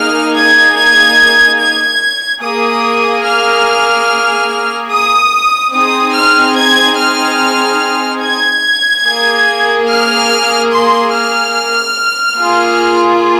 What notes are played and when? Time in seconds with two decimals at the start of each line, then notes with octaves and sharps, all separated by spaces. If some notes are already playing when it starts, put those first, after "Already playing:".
Already playing: A#3 D#4 G#4 F6
0.34 G#6
0.76 G#6
1.59 G#6
2.42 A#3 G#4 D#6
3.25 F6
4.91 D#6
5.73 C4 D#4 G#4 D#6
6.15 F6
6.56 G#6
6.97 F6
8.22 G#6
9.06 A#3 G#4
9.88 F6
10.72 C6
11.13 F6
12.37 A#3 F4 G#4